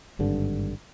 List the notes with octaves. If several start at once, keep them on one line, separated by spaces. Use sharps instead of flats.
G#1 G2 D3